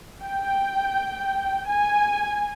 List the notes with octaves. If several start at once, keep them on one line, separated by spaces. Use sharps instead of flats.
G5
G#5